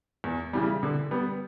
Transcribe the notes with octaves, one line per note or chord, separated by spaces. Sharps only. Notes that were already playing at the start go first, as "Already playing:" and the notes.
E2
C#3 E3 G3
D3
G3 B3